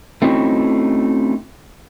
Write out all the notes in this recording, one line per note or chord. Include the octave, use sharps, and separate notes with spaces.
A3 C4 C#4 D#4 E4 F#4